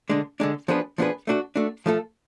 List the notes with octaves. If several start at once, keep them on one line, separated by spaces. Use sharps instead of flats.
D3 G#3 D4
D3 G#3 D4
F3 B3 D4 G#4 B4
F3 B3 D4 G#4 B4
A3 D4 F#4
A3 D4 F#4
F3 A3 F4 A4